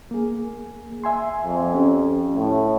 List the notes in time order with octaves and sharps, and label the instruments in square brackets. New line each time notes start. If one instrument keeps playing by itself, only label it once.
[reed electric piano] A#3 G#4
E5 G#5 C6
[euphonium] F2
[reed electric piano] C#4 G4
[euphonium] A2